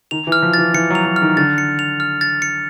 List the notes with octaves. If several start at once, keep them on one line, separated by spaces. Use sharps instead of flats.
D#3 F7
E3
F6
F3
E3 A6
E3 C#7
F#3
F7
F#3
F6
D#3
D3 A6
C#7
F7
F6
A6
C#7